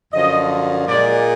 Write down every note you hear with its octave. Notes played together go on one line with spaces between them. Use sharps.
F#2 D3 F3 D#5
A#2 G#3 D5